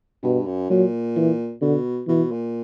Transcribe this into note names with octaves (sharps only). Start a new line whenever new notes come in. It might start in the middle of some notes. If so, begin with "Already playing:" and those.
G2 B2
F#2
A#2 F#3
E3
B2 D3
B2 E3
A#2